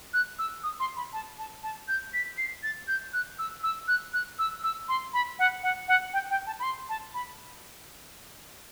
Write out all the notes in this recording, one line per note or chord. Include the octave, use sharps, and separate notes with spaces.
F#6
E6
D#6
C6
B5
A5
A5
A5
G6
B6
C7
A6
G6
F#6
E6
E6
F#6
F#6
E6
E6
C6
B5
F#5
F#5
F#5
G5
G5
A5
B5
C6
A5
B5